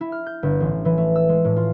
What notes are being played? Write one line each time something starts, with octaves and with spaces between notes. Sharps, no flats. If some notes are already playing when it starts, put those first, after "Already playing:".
E4
F6
G6
G1
A1
E3
A3
E6
G#3
A2
F4